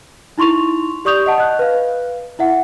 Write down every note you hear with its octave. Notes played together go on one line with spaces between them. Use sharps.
D#4 E4 C6 C#6 F7
G4 D5 C#6 D#6 G6 F7
D#5 F#5 A5
D#5 F#6
B4 F5
E4 E5 F#5